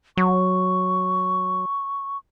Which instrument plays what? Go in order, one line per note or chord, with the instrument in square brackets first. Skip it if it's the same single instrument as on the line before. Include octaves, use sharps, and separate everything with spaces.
[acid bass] F#3 [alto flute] C#6